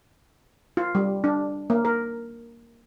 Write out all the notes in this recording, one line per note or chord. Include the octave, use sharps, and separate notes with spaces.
F4
G3
D4
A#3
A#4